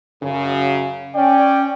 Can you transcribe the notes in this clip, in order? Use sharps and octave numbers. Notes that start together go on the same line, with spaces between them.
F#2 C#3
C#4 D5 G5